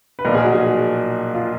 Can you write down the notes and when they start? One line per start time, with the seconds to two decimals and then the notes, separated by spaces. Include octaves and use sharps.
0.19 B4
0.25 B1 A#2 F3 A#4
0.34 G#4
0.43 F#4
0.52 G#4
1.34 F4